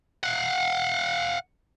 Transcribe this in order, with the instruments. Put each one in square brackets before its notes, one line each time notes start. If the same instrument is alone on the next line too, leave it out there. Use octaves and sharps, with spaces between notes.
[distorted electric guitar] F5 F#5